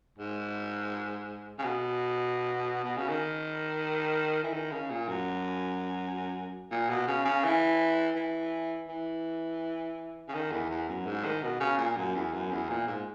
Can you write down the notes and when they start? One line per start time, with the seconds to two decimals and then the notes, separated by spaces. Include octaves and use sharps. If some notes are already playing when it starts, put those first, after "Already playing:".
0.18 G#2
1.59 C#3
1.64 B2
2.84 B2
2.97 C#3
3.09 D#3
4.43 E3
4.53 D#3
4.72 C#3
4.90 A#2
5.08 F#2
6.71 A#2
6.89 B2
7.07 C#3
7.25 C#3
7.44 E3
8.16 E3
8.88 E3
10.28 C#3
10.34 D#3
10.52 E2
10.70 E2
10.88 F#2
11.06 G#2
11.25 D#3
11.42 B2
11.60 C#3
11.78 A#2
11.97 F#2
12.15 E2
12.33 F#2
12.51 E2
12.69 A#2
12.87 G#2